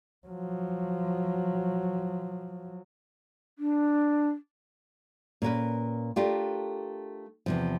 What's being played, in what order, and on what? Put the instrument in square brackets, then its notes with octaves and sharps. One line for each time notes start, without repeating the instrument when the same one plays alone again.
[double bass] F3 F#3
[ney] D4
[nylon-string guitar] A#2 C#4 A#4 B4
A3 D4 F4 G4 A#4
E2 C3 F3